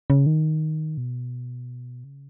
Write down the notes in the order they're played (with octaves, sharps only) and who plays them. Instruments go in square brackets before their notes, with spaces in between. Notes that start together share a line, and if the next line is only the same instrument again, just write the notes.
[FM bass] C#3
D#3
B2
C#3